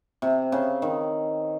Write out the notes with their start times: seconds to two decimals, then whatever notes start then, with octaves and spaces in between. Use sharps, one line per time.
0.22 C3
0.52 C#3
0.82 D#3